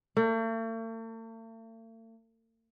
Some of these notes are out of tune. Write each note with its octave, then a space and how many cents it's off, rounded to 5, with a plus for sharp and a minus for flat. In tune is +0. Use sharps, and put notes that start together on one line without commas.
A3 +45